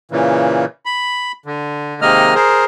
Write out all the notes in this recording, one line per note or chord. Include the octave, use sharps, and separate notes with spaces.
A#2 C#3 E3
B5
D3
C3 D#3 G#3 A#3 D#5 F6
G#4 A#4 C5